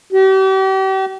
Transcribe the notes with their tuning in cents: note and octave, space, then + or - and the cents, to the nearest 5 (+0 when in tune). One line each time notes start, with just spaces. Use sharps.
G4 -40